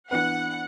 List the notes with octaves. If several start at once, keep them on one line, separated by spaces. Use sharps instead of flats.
E3 B3 D4 B4 F#5